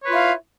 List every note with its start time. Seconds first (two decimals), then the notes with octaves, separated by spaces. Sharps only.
0.02 C#5
0.05 B4
0.09 F4
0.12 E4
0.15 F5